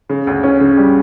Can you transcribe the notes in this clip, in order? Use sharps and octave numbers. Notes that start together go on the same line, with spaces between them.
C#3
D2
C#4
C#3
G3